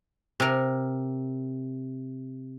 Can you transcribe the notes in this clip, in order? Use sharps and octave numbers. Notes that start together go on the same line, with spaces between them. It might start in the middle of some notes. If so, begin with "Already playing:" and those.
C3 A#4